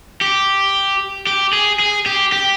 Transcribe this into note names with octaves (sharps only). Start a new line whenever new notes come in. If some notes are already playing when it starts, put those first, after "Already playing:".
G4
G4
G#4
G#4
G4
G4